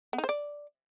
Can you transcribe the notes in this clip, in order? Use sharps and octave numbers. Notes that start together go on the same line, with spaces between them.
B3
D#4
C5
D5